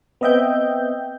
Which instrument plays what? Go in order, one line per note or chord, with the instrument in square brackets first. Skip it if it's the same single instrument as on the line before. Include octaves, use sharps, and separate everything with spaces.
[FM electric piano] B3 C4 D#5 E5 G5 G6